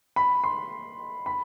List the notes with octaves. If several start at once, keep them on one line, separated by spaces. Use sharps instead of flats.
B5
C6
B5